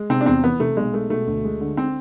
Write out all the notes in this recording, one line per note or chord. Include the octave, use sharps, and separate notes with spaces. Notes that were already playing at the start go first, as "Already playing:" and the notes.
Already playing: G#3
C3 C4
D4
E2 C4
E3 B3
C3 A3
B1 G#3
G#3 A3
B2 A3
D2
G#3
D3
C4